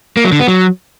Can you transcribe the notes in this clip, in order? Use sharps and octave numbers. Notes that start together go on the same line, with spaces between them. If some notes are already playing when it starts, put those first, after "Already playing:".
A#3
F#3
D3
B3
F#3